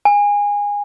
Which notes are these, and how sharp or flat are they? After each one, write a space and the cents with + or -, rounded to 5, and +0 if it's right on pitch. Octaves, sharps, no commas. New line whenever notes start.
G#5 -20